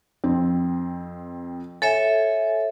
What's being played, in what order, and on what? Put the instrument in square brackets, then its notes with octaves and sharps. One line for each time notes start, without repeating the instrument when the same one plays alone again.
[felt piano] F2 C4
[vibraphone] A4 C#5 E5 [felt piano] G#5